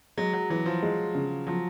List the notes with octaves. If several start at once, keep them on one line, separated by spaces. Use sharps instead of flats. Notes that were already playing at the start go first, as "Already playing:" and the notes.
F#3 G#3
F#3
E3 F#3
F3
G#3
C#3
F3 F#3